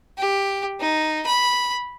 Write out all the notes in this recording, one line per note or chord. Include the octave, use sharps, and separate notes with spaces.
G4
D#4
B5